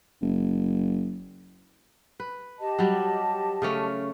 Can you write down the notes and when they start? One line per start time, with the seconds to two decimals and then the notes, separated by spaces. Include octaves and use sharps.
0.21 F#1
2.20 B4
2.59 G4 D#5 A5
2.79 F#3 G3
3.62 C#3 A3 C#4